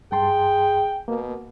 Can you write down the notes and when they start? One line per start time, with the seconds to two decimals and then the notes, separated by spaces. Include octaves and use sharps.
0.12 G2 G#4 G5 A5 C6
1.08 B2 A#3